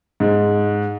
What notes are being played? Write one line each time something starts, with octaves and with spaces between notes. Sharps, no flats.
G#2